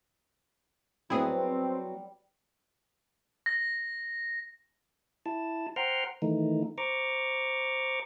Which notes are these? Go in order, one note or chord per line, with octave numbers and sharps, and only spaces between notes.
F#3 G3 B3 C4 E4 G#4
A#6
E4 A5
C5 F#5 G5 A#5 C6 F6
D#3 E3 A3 D#4
C5 A#5 C#6 D6